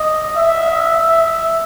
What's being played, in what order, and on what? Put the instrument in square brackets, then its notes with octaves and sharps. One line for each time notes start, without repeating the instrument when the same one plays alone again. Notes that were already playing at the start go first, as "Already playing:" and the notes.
Already playing: [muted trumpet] D#5
E5
E5